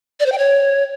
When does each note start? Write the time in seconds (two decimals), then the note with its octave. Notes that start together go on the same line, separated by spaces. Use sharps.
0.20 D5
0.26 C5
0.32 G5
0.38 C#5